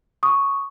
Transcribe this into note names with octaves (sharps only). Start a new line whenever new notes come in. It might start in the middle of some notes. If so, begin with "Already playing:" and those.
C#6 D#6